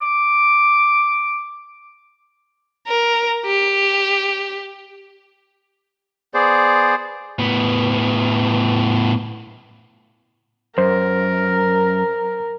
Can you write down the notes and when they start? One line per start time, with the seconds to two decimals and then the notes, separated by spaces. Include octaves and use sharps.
0.02 D6
2.87 A#4
3.46 G4
6.34 B3 G#4 C5 D5
7.39 A2 B3
10.78 F#2 A#4 C5